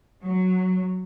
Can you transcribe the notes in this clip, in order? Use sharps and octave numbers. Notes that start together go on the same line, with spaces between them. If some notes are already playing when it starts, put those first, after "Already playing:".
F#3